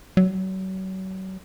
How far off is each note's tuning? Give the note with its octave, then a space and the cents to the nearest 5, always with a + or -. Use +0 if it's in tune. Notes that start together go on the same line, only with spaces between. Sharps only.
F#3 +35